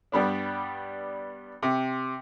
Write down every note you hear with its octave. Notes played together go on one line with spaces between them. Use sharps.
G2 G3 B3 D4
C3